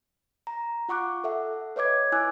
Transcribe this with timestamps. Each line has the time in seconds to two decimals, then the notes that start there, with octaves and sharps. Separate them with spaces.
0.47 A#5
0.89 F4 F#5 C#6 D6 F#6
1.24 A4 E5 F#5
1.76 B4 C#5 D#5 D6 G#6
2.12 E4 G#5 D6 E6 F#6